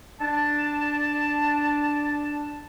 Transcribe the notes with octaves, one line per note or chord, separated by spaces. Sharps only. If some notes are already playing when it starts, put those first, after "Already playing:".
D4 A5